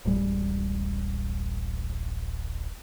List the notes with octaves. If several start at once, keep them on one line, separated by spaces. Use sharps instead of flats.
D1 A1 G3 G#3